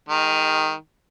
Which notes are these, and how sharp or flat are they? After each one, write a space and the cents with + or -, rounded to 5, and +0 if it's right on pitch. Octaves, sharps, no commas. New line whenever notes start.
D#3 +5 G#3 -30